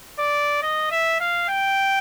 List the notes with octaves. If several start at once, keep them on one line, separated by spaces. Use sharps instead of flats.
D5
D#5
E5
F5
G5